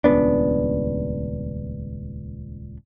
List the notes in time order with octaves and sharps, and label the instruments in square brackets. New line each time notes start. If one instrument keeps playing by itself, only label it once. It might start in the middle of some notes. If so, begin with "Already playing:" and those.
[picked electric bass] D#1 C#2 B3 D4